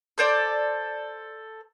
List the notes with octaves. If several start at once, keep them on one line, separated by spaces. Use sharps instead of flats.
A4 C5 D5